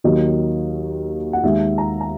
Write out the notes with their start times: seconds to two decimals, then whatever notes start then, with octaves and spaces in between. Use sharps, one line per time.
0.04 D#2 D#3 F#3 D#5
1.33 F#5
1.43 D#2 D#3 G#3 E5
1.78 A#5
2.01 A#5